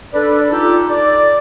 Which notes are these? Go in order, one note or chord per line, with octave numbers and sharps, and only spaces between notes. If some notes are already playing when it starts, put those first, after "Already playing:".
D4 A4 B4 D5
D#4 F4 G4 A4
D5